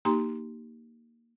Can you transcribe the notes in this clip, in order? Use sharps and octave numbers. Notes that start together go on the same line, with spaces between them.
A#3 D#4 G4 A#5 C6